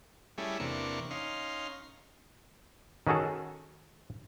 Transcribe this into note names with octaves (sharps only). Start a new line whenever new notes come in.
G3 A3 C#4 E4 G#4
E2 C3 A#3 D4 C#6
C#4 D#4 F5 C6
D#3 C#4 F#4 G#4 A4